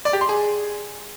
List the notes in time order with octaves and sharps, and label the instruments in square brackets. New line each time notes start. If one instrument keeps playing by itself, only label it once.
[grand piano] D5
G4
C6
G#4